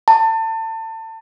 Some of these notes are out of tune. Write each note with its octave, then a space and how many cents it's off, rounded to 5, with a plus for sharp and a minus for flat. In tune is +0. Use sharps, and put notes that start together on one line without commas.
A5 +30